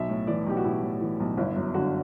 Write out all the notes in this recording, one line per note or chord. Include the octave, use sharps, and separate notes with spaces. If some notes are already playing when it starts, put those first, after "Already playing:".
Already playing: B1 E5
A2
E3 D5
B1 G4
F#4
B1 E4
A2
E3
B1
G1 E4
F#2
D3 F#4